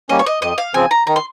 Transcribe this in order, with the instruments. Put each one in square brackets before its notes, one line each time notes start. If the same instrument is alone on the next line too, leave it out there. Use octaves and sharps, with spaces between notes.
[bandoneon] G3 A#3 C#4 [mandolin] D#5
[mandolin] C#5
D#5
[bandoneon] F2 [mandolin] D#5
[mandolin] F5
[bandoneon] C#3 F3 C4 [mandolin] G#5
[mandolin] A#5
[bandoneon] D#3 [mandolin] A#5
[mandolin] C6